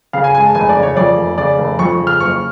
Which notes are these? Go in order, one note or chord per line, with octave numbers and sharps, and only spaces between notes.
C#3 F5
G#5
G#3 G#5
A5
F1 G#5
D5
C#3
C#5
F2 D5
F1
C#3 D5
F1
F2 C#6
C#3
F6
F#1 C#6